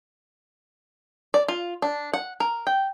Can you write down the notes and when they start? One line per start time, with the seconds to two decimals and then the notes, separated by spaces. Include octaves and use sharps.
1.34 D5
1.48 F4
1.82 D4
2.13 F#5
2.40 A#4
2.67 G5